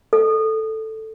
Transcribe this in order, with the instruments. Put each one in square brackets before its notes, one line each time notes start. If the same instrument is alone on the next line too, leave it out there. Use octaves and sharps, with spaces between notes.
[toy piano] A4